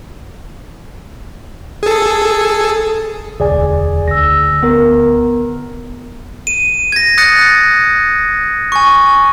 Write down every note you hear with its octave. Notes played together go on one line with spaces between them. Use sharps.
G#4 A4
E1 D2 G#4 D5 G#5
D2 E6 A#6
B3 A#4
D#7
G#6 A#6
D#6 F#6 A6 A#6 C#7
G#5 C#6